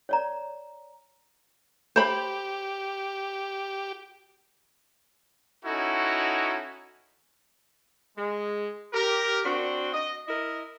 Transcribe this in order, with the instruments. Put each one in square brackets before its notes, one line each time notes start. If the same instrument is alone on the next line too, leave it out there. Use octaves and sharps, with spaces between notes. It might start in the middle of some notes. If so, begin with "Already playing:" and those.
[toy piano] C#5 D5 A#5
[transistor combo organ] G4 [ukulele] C5 B5
[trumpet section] C#4 D#4 E4 F#4 A4
[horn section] G#3
G4 A#4
C4 D4 F#4
D#5
E4 A#4 D#5